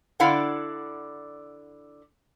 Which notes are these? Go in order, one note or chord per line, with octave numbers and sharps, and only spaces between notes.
D3 E4 D5 F5 F#5